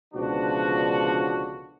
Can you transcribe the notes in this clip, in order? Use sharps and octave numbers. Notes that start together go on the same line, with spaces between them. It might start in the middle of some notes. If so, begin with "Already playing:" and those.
C#2 B2 D3 F3 D4 F#4